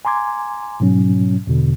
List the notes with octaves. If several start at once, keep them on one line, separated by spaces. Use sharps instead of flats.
G#5 A#5 C6 D6 G#6
G#2 B2 F#3 C#4
E2 B2 D3